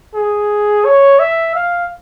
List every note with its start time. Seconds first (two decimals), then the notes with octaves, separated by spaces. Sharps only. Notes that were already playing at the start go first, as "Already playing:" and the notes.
0.15 G#4
0.85 C#5
1.19 E5
1.55 F5